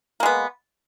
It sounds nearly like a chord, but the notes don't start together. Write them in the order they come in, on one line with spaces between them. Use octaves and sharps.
A#3 G#3 B3